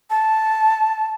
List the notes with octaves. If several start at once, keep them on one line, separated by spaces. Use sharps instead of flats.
A5